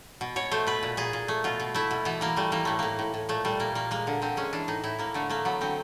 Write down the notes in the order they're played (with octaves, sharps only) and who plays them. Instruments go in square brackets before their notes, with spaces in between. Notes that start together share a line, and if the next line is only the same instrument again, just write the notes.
[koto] B2
B2 C#5
A3 C5
B2 B4
A#2
A#2 G#4
A#2
A3
B2 F4
B2
A3 E4
B2
E3 B3
E3 A#3
G3 A3
E3 A#3
A2 A3
A2 A#3
A2
A2
A#2 A3
G3 A3
A#2 A#3
A#2 A#3
G#3 A#3
D3
D3 C4
G#3 C#4
E3 D4
A2 D#4
A2 E4
A2 A#3
D3 A3
A3 A#3
F#3 B3
D3 C4